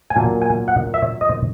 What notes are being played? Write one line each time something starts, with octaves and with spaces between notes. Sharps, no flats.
G#5
A#2 F#3 A#3 A5
G#5
F#5
E5
D#5